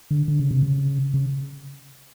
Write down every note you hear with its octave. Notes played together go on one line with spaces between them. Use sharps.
D3
D3
C#3
C3
C#3
C#3